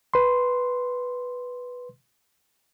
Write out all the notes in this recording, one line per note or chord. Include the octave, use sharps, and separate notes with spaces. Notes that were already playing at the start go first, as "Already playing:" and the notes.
B4 C6